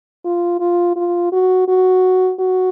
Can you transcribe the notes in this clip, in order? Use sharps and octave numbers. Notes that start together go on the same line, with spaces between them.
F4
F4
F4
F#4
F#4
F#4